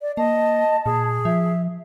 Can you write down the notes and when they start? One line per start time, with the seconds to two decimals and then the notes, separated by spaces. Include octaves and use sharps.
0.02 D5
0.17 A#3 D#5 A5
0.86 A#2 G#4
1.25 F3 E5